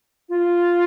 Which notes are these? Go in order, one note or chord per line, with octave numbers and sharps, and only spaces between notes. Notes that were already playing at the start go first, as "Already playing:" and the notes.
F4